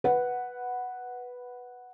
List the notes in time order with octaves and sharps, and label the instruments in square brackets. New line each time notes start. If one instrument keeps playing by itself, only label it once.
[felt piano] B4 F#5